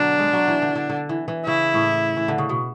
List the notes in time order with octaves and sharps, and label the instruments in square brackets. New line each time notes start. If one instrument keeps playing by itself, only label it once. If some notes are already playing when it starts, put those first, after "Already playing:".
Already playing: [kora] B2 D3 F#3 [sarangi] D4
[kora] G#3
F#3
E3
D3
D3
D3
E3
E3
[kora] C#3 [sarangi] E4
[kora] A2
E3
D3
C#3
B2